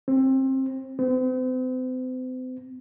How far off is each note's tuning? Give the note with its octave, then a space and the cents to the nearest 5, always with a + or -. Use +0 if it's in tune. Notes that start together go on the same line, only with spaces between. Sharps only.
C4 +25
C4 -40